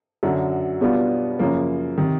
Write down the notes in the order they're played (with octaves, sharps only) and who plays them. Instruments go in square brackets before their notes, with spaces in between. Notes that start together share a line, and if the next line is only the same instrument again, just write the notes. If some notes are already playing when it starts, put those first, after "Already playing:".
[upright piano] F#2 D3 F#3
B2 G3 B3 D4 F4
F#2 C#3 F3 A#3
C3 D#3